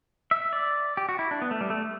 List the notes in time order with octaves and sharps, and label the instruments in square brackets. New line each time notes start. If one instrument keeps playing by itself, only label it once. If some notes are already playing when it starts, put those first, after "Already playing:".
[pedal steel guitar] E5
D5
G4
F#4
E4
D4
B3
A3
G3
A3